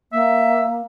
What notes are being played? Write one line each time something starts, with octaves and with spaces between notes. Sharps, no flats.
A#3 E5